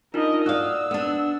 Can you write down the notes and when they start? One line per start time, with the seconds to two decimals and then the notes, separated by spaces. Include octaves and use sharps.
0.14 D4 D#4 F4 A#4 D#5
0.46 F#4 D5 F5 D#6 E6 F#6
0.91 B3 D4